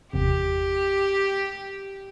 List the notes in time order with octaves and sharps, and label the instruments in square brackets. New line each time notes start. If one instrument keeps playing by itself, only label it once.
[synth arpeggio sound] G1 E2 C3 [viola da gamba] G4